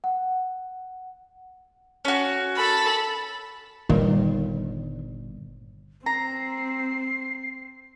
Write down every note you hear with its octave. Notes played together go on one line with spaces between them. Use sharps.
F#5
C#4 F#4
A4 B5
G1 A#2 D#3 G3
C4 A#5 C7